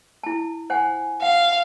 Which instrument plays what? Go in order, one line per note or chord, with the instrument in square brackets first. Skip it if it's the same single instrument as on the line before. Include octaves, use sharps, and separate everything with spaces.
[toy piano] E4 A5
C5 F#5 G#5
[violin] F5 [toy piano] F#5